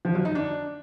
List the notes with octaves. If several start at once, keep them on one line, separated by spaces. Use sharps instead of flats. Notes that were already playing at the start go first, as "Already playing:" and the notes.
F3
F#3
D#4
D4